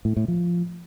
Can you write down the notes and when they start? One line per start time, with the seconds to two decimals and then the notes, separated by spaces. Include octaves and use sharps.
0.05 A2
0.17 A2
0.28 F3